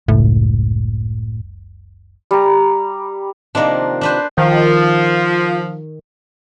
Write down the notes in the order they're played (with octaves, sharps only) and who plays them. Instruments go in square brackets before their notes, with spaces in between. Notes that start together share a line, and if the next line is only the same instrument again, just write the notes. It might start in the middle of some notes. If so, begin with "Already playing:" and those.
[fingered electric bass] F#1 C#2 [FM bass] A2
[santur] G3 A#5
[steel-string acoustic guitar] C3 D#3 F3 [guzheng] A#3 D4
[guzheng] D4 B4 C5
[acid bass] D#3 [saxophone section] F3